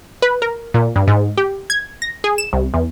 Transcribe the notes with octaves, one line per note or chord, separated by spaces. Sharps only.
B4
A#4
A#2
G2
G#2
G4
G#6
A#6
G#4
E7
C2
E2